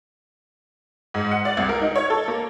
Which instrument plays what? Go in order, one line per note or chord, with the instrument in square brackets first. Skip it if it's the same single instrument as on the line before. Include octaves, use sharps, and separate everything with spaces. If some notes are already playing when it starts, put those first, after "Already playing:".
[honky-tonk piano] G#2
F#5
D5
C2
A#4
D#4
C#5
A4
A#3